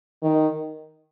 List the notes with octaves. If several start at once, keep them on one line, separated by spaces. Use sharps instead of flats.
D#3